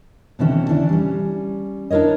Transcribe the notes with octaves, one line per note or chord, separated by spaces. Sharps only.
B2 D3 E3 C4 C#4 A4
E3 D4 E4 D5
G3 C#4
D4 E4 A#4 C#5 D#5